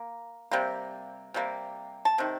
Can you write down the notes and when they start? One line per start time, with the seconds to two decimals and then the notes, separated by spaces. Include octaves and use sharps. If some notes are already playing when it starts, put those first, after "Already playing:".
Already playing: A#3
0.51 C3 G3 A#3
1.34 C3 G3 A#3
2.05 A5
2.18 C3 D#3